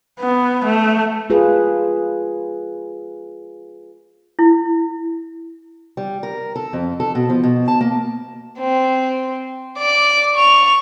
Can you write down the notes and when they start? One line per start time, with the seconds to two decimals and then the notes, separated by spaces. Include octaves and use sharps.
0.20 B3
0.65 A3
1.30 F4 G#4 B4
4.39 E4
5.97 G3
6.23 A#4
6.56 A4
6.73 F2
7.00 A4
7.15 B2
7.30 F3
7.43 B2
7.68 A5
7.81 A#3
8.59 C4
9.79 D5 D6
10.35 C#6 F7